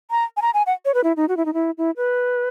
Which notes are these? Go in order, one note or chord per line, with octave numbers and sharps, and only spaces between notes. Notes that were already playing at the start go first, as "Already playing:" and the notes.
A#5
G#5
A#5
G#5
F#5
C#5
B4
E4
D#4
F#4
E4
D#4
E4
E4
B4